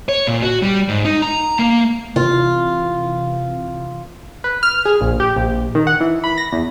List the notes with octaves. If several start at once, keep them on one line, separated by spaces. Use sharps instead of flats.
C#5
A#2
F#4
G3
G#2
D#4
A#5
A#3
C3 E3 F4
B4
F6
G#4
A#1
G4
A#1
D#3
F#5
E3
B5
A#6
E2